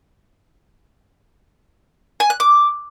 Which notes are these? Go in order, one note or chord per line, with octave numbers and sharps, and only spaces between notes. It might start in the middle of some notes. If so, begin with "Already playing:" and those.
G#5
F#6
D6